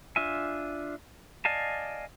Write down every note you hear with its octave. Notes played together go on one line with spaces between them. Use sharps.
D4 F4 E5 G#5
D5 D#5 F5 G#5 A5